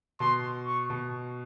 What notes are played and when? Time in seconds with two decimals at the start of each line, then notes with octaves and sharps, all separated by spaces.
0.20 B2 C6
0.66 C#6
0.90 B2